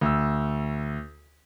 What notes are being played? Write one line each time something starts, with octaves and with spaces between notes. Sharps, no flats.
D2 E6